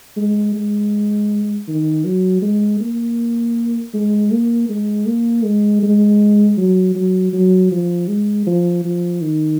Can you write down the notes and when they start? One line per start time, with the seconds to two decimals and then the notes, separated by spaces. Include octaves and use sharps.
0.17 G#3
0.55 G#3
1.68 D#3
2.05 F#3
2.42 G#3
2.81 A#3
3.94 G#3
4.32 A#3
4.69 G#3
5.07 A#3
5.44 G#3
5.83 G#3
6.58 F#3
6.95 F#3
7.33 F#3
7.72 F3
8.08 G#3
8.47 F3
8.85 F3
9.22 D#3